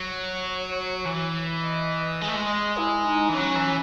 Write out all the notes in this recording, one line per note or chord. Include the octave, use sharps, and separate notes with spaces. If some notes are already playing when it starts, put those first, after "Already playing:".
Already playing: F#3 C#5
E3
D#5
G#3 D#5
A3
G#3
D#5
E4
D#4
E3
F#3 C#4
E3